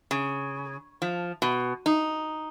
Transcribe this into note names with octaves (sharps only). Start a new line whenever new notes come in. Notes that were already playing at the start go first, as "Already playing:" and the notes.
C#3
F3
B2
D#4